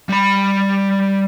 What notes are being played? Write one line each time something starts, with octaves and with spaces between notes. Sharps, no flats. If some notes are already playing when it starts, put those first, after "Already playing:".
G3 B5